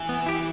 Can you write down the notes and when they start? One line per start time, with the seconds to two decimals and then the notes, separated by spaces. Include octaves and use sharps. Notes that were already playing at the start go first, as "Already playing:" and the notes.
Already playing: E3
0.09 B3
0.26 E4 G4